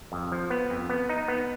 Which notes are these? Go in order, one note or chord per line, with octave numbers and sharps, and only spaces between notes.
F2
F3
B3
F2
B3
D#4
B3